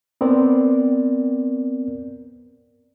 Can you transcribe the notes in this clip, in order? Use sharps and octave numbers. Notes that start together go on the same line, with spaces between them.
B3 C4 A#4 D5